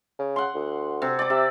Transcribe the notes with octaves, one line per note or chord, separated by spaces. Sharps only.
C#3
F#5 C6
D2
C3
D5 D6
C3 E5